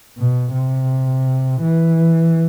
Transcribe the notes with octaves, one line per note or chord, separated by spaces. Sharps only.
B2
C3
E3